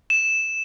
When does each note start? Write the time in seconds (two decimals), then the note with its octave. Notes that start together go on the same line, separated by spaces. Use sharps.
0.10 E7